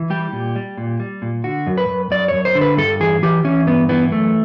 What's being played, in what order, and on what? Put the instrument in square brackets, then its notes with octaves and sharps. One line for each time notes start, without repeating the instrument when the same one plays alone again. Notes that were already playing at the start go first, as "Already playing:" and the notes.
Already playing: [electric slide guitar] E3
G3 G4
A#2
G3
A#2
G3
A#2
D3 F#4
F#2
B4
F#2
F#2 D5
F#2 C#5
C5
D3
B4
G2 A4
E3 G#4
E3 G4
E3 C#4
G2 B3
E3 B3
F#2 A3